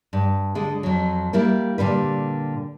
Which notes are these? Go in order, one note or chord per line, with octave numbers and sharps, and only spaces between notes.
G2
D3 G#3
F2 F#3
G3 A#3 E4 A#4
A#2 D3 G3 B4